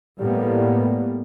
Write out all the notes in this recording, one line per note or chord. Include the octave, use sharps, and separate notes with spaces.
A2 G3 A#3 B3